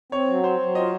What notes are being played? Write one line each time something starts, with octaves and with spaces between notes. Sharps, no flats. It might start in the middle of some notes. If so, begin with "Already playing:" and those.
C4 C#5
F#3
C4 C5
F#3
F4 D#5